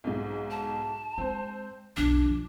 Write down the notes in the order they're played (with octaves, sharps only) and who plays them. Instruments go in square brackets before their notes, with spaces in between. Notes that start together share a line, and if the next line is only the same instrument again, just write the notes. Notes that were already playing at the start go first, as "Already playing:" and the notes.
[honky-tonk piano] B1 G#2
[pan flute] A5
[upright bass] G#3 [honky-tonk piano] C4 C5
[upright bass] B1 F2 [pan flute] D4 [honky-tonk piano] D6
[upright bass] F3